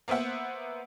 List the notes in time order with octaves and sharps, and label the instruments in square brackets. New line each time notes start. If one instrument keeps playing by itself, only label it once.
[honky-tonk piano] A#3 B3 C5 E5 F#5